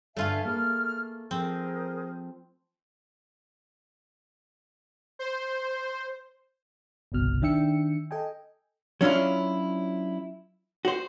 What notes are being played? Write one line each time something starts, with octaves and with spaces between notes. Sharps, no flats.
G2 D3 A3 F4 E5 F5 G#5
A#3 G#4 B4 F6
F3 C4 G#4 A#4 C5
C5
G1 C2 B2 F6
D#3 D4 E5 G5 E6 C#7
A4 D#5 G5 G#5
F#3 C#4 D4 E4 F4
F#4 C5